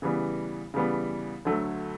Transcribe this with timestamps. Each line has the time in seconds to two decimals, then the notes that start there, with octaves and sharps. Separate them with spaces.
0.02 C#3 E3 G3 B3
0.74 C#3 E3 G3 B3
1.45 D2 D3 F#3 A3